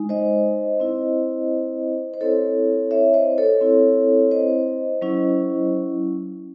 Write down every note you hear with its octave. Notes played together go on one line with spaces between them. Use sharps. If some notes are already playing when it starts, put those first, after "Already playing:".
Already playing: G#3 D#4
C5 D#5
C4 E4
C5
C4 E4 A4 C#5
C#5 E5
C5 D#5
A4 C#5
C4 E4
C5 D#5
F#3 C#4 E4